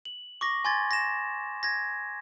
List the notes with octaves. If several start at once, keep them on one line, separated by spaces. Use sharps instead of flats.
F#7
C#6 D6 A#6
G#5 C6 G#6 A6
A#6 E7
G#6 A#6